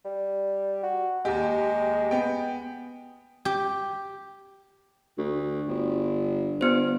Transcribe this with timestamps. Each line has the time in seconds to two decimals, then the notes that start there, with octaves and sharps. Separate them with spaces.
0.05 G3
0.83 F#4
1.25 D#2 G#3 G4
2.11 B3 G5
3.45 G4
5.18 D2
5.69 G1
6.61 G1 B3 C5